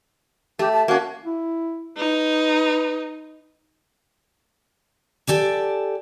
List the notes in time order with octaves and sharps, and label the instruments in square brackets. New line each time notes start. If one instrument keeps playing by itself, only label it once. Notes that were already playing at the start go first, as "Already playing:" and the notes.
[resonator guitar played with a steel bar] A3 [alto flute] G4
[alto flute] A5
[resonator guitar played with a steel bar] A#3 C#4 [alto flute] F#4
[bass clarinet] E4
[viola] D#4 [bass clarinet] B4
[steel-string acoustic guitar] G4 A4 D5 G#5